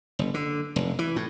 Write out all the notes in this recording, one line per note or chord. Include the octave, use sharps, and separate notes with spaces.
F#1
D3
F1
E3
A2